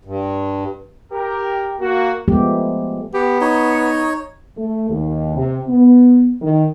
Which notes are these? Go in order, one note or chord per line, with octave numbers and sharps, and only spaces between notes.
G2
G4 A#4
A#3 F#4
F3 G#3 A3 B3 G4
B3 G4
D#4 C#5
A3
D#2
C3
B3
D#3